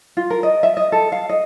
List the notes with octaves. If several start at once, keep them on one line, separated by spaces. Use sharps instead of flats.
F4
A#4
D#5
E5
D#5
A4
F5
D#5